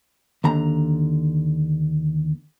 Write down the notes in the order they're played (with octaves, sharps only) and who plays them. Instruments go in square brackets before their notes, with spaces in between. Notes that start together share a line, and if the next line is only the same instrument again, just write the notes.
[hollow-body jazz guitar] D#2 D3 A#5